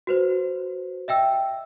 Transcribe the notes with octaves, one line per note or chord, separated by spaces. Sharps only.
F#4 B4 C5
D#5 E5 G5 E6